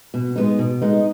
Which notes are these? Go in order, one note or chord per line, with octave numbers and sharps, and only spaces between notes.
B2
G#3 B3 D#4
B2
G#3 B3 D#4